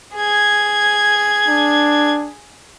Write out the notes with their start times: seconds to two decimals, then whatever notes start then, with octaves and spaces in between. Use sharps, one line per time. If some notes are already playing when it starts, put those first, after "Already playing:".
0.16 G#4 G#6
1.49 D4